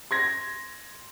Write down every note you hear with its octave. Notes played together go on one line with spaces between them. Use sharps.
C6 G#6 A#6